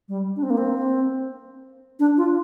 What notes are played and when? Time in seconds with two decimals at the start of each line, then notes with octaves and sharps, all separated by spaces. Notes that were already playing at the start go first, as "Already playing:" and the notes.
0.09 G3
0.36 D4
0.43 C4
0.50 A#3
0.57 C4
1.99 D4
2.17 F4